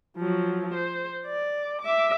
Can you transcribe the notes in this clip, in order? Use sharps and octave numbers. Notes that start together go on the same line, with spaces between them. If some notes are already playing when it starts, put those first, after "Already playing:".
F3 F#3
C5
D5
E5 D6